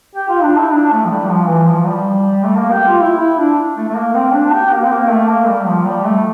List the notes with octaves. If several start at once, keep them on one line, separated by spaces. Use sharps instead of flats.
G4
F4
D4
E4
D4
A3
F3
G3
F3
E3
F3
G3
A3
A#3
G4
F4
E4
E4
D4
A3
A3
A#3
C4
D4
G4
A#3
C4
A#3
A3
A#3
G3
F3
G3
A3